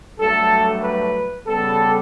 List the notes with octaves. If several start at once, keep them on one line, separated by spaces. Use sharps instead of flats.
G2 F#3 A3 A4
B4
C#3 G3 B3 A4